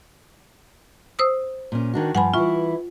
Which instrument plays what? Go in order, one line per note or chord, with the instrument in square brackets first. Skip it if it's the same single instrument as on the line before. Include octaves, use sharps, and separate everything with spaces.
[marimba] C5 D#6 E6
[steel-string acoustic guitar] A#2 C#4
D#3 D4 F#4
[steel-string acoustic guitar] G2 F3 [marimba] F#5 G#5 B5
[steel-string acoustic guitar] E3 E4 [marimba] F4 C#6